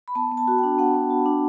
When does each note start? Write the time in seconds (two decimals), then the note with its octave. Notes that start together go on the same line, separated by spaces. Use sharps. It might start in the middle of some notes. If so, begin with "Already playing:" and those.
0.08 B5
0.15 B3 A5
0.32 B3
0.37 A5
0.48 F#4
0.58 D4 G5
0.79 B3 F#5
0.94 B3
1.11 F#4
1.26 D4